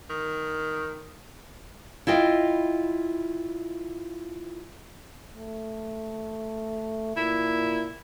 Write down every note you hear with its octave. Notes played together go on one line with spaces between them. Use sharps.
D#3
E4 F4 D#5 G5
A3
A#2 E4